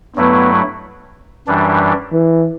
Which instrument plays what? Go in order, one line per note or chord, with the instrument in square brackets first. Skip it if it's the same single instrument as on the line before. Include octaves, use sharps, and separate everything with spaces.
[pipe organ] G2 F#3 A3 E4 [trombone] B3
[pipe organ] F#2 E3 G3 D4
[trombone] E3